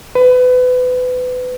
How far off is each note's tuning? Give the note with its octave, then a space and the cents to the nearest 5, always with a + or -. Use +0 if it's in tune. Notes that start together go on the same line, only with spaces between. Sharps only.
B4 +30